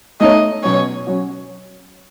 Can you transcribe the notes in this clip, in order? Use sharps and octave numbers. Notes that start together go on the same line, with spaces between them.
A3 D#4 A4 C#5 D#5
B2 F#3 C#4 C#5
F#3 C#4 F#4